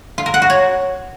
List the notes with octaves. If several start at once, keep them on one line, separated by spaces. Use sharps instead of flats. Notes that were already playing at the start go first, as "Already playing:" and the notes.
F4
A#4
F#5
F#4
C#5